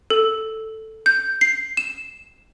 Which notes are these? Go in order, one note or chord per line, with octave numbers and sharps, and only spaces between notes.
A4
G6
C7
E7